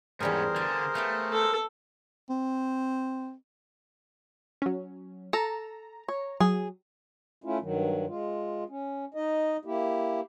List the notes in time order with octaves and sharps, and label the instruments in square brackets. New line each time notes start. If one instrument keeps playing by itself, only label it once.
[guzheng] E2 G3 G#5 [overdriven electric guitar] G#2 C#4 [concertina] G#4 A#4 C5
[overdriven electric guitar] D3 [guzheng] F5 G#5
[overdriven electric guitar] A3 [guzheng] B3 F5 G5
[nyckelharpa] A4
[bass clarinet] C4
[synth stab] F#3 C#4
[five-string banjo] A4 [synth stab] A#5
[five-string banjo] C#5
[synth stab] F#3 [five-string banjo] G#4
[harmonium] A3 C#4 E4 F4
G2 D#3 F#3
G#3 F4
C#4
D#4 D#5
A#3 E4 G4